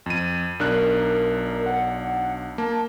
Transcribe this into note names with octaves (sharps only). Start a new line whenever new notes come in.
F2 D#7
B1 D4 A#4 F#6
F#5
A#3 A5